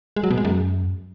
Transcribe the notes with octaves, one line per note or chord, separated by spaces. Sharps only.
G#3
F#3
B2
G#3
F#2